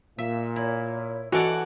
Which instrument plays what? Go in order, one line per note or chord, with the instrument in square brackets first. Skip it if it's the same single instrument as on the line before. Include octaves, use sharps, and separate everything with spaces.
[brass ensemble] A#2 [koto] E5 [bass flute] F5
[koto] E4 [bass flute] C#5
[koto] E3 D5 F#5 [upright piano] F#4 A4 [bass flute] D#5